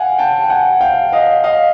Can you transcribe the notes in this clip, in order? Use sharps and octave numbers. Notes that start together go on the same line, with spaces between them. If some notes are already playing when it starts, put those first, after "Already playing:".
Already playing: F5 F#5 G#5
G5 A5
G5
F#5 G#5
F5 G5
D#5 F5
D#5 F5